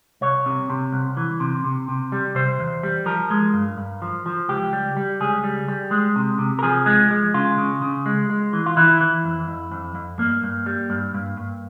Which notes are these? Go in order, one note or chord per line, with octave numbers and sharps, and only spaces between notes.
C2 C#5
C3
C3
C2
E3
C3
C3
C3
G3
C3 C5
E2
G3
F3 A#4
G#3
G2
G2
F3
F3
C#2 G4
G3
G3
C#2 G#4
G3
G3
G#3
C3
C3
A#4
F3 G#4
G#3
G#3
C#3 F4
C#3
C#3
G#3
G#3
E3
F4
E3 E4
E3
F2
F2
F2
F2
G2 A#3
G2
G3
G2
G2
G2